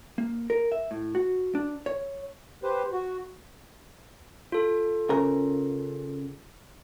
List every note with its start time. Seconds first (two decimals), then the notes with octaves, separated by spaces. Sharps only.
0.18 A#3
0.50 A#4
0.72 E5
0.91 A2
1.15 F#4
1.55 D4
1.86 C#5
2.63 G4 B4 C5
2.92 F#4
4.52 F4 A4
5.10 C#3 A#4